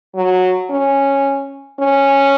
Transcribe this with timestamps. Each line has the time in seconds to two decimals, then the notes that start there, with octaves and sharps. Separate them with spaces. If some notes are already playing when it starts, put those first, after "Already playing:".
0.15 F#3
0.70 C#4
1.79 C#4